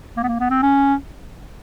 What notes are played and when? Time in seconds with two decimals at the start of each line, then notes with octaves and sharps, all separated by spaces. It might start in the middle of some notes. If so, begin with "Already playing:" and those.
0.17 A#3
0.23 B3
0.28 A#3
0.40 B3
0.50 C4
0.63 C#4